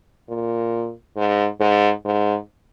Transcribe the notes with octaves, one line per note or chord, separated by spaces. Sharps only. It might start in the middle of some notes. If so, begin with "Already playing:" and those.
A#2
G#2
G#2
G#2